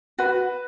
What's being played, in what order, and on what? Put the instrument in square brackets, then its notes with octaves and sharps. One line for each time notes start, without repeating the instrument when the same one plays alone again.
[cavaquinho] F#4 [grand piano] B4